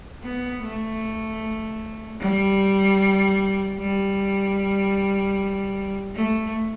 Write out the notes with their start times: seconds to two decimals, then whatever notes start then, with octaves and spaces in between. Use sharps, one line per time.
0.23 B3
0.63 A3
2.20 G3
3.78 G3
6.15 A3